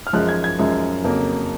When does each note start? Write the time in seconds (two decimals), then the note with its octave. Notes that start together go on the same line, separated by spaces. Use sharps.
0.07 F6
0.13 F#2 F3 G#3 F#6
0.29 G#6
0.44 G#6
0.58 F#2 F3 G#3
1.04 F2 C#3 F#3 A#3